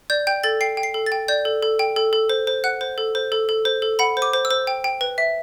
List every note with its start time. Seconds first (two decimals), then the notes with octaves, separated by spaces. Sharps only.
0.10 D5 G6
0.27 G5 G6
0.44 A4 A6
0.61 G5 C7
0.77 G5
0.83 C7
0.94 A4
1.06 A6
1.12 G5
1.28 D5 G6
1.45 A4
1.63 A4
1.79 G5
1.96 A4
2.13 A4
2.30 C5
2.47 C5
2.64 F#5 F#6
2.81 C5
2.98 A4
3.15 C5
3.32 A4
3.49 A4
3.65 C5
3.82 A4
3.99 F#5 B5
4.17 C5
4.22 D6
4.33 C5
4.45 E6
4.51 C5
4.67 G5
4.84 G5
5.01 B4
5.18 E5